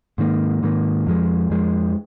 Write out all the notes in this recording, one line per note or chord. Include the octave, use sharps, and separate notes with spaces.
G#2 D#3 A#3
G#2 D#3 A#3
F2 F3 G#3
F2 F3 G#3